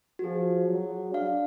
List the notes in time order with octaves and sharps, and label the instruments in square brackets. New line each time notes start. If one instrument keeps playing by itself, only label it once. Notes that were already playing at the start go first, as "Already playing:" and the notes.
[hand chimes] F#4
[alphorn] F3 [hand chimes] G#4
[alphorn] F#3
[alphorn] D4 [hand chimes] F5